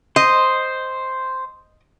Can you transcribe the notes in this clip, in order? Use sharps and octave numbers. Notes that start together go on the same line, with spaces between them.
C5 D#5